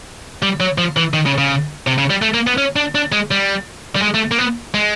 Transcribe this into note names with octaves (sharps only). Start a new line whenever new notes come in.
G3
F#3
F3
E3
D#3
C#3
C#3
C3
C#3
G3
A3
A#3
B3
C#4
D4
D4
G#3
G3
G3
G#3
A3
A#3
B3
G#3